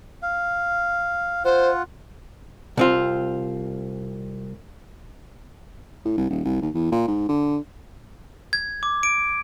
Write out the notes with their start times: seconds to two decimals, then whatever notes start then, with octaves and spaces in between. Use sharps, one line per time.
0.23 F5
1.45 F4 C5 F#5
2.77 C2 C4 F4
6.05 A2
6.18 C2
6.30 D#1
6.45 C2
6.62 D#2
6.74 E2
6.92 A#2
7.08 G#2
7.29 D3
8.53 G#6
8.83 D6
9.03 D7